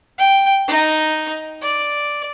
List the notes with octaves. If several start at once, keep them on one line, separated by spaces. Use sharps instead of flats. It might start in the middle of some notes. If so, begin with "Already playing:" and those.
G5
D#4
D5